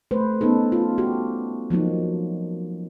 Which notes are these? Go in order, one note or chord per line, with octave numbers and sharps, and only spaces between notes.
A3 B4 C5
B3 C#4 D#4 A4
F4
F#4 G4
F3 F#3 A#3 D#4